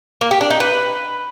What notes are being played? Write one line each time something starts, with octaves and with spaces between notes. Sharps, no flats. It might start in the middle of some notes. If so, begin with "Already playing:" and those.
A#3
G4
D4
D#4
B4